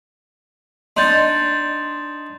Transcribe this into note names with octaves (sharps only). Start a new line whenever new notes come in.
D4 D#4 C6 G6 A6